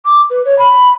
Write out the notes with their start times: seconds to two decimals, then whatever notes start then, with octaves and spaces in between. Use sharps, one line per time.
0.05 D6
0.30 B4
0.45 C#5
0.59 B5